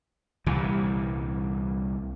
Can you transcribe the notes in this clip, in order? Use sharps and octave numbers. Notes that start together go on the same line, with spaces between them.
C2 A#2 E3 G3